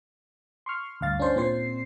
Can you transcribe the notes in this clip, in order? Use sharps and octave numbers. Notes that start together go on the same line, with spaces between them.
C6 C#6 F6
D2 G2 F5 A6
C#4 D4 C5 C6
A#2 C4 C5 C7